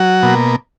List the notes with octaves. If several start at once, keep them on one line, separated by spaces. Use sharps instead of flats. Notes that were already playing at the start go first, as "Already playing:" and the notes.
Already playing: F#3 F#4
B2 A#3